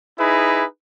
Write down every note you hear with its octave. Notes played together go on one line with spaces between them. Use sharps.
D#4 E4 G#4 B4